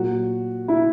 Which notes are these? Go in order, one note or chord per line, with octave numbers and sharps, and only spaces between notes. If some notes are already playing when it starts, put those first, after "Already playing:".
Already playing: A#2 F#3 F#4
E4